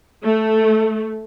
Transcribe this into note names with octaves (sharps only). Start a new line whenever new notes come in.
A3